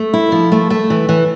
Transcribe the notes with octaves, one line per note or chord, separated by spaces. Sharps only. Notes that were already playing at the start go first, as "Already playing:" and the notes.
Already playing: A3
E4
F3
A3
A3
E3
E3